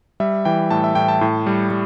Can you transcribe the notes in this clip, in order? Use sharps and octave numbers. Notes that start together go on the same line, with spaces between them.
G3 E5
E3 G5
A2 A5
E5
A2 G5
A5
A2
G3
G3